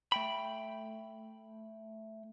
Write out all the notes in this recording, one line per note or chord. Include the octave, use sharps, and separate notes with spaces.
A3 G5 B5